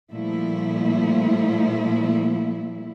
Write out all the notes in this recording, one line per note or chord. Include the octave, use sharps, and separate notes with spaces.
A#2 F3 G3 A3 A#3 E4